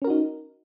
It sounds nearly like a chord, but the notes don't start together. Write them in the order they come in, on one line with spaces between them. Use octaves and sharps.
C#4 A#4 F#4 D#4